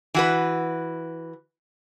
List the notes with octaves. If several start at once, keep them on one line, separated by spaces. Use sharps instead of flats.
E3 F#4 B4